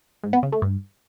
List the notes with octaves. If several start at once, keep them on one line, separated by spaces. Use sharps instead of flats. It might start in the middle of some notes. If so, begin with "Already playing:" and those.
G#2
B3
C#3
A3
G2